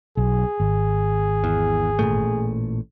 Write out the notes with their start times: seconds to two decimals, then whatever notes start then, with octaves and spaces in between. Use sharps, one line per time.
0.17 B1 G#4
0.60 G#1
1.44 E2
1.99 A1 A#2 A3